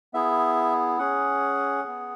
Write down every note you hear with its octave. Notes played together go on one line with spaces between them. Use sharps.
B3 E4 G#4 E5
C#4 G#4 F#5
B3 G#4